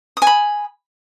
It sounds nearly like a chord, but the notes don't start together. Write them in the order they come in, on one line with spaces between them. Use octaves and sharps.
D#6 G#5 B5